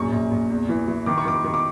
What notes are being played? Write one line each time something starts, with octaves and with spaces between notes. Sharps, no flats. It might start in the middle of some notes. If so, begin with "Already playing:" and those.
Already playing: A#1 F#2 C#6
A#1
A#1
E2
E3
E3
D#3 D6
C#6
D#3 D6
D#3
D6